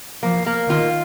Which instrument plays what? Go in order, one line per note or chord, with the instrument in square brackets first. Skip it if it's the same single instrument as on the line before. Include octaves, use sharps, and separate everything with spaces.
[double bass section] F3 [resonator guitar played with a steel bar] A#3
[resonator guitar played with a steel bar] A#3
[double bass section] D#3 [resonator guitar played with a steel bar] F4